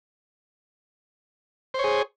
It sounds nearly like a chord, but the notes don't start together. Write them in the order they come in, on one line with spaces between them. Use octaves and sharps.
C5 C#5 G#4